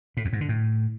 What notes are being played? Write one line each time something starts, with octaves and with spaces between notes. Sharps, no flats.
A2
E2
G#2
D3
A2